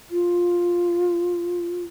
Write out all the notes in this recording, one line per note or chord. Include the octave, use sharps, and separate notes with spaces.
F4